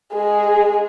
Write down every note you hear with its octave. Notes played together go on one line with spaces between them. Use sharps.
G#3 G#4